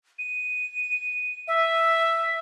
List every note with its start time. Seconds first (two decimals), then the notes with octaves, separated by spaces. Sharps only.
0.19 D#7
1.48 E5